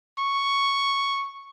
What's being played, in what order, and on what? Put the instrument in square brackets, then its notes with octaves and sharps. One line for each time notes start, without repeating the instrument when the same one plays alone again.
[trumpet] C#6